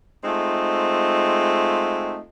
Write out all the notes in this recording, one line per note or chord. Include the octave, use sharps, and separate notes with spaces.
G#3 A3 C4 D#4 F4